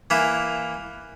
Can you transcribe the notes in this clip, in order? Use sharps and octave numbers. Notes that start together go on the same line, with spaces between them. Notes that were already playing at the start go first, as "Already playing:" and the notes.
E3 A#3 E4